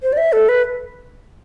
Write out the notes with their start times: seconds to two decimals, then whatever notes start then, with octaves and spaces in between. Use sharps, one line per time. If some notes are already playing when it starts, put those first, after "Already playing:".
0.03 C5
0.13 D5
0.17 E5
0.33 A4
0.49 B4